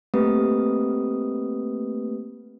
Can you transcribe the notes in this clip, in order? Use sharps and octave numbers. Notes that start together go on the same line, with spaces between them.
A3 A#3 C4 G4 B4 D#6